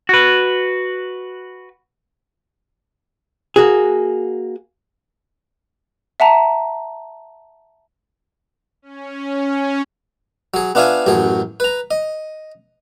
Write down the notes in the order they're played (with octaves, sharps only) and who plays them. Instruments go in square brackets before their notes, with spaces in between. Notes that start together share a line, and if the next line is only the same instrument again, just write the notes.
[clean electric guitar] F#4 B4
[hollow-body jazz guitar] A#3 F#4 G#4
[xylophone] E5 F#5 A5 A#5
[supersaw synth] C#4
[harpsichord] F#3 G#4
B3 D4 F4 E5 F5 G#5
A1 F#2 F#3 G#4
B4 A#5
D#5